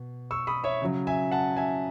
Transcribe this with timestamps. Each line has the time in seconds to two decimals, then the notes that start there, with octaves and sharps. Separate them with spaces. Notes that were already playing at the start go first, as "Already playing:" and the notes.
Already playing: B2
0.31 C#6 E6
0.47 B5 D#6
0.64 C#5 E5
0.82 C#3 F#3
1.07 E5 G#5
1.32 F#5 A5
1.56 E5 G#5